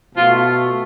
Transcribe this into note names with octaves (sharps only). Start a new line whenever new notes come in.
B2 A3 F4